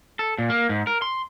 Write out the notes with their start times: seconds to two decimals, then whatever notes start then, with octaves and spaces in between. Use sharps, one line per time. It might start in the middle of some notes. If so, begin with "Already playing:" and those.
0.19 A4
0.38 A#2
0.50 A#3
0.69 G#2
0.87 A#4
1.02 C6